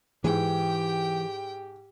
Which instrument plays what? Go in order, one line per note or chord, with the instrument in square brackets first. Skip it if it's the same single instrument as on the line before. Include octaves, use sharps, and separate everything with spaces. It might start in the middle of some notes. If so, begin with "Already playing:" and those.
[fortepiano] G#2 [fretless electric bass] E3 [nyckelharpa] G4 [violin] G5